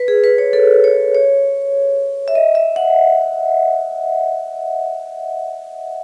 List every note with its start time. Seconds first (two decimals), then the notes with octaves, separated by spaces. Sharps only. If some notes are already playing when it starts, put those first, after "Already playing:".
Already playing: B4
0.08 G#4
0.24 B4
0.38 C#5
0.53 A4
0.84 C#5
1.15 C#5
2.28 E5
2.35 D#5
2.55 E5
2.76 F#5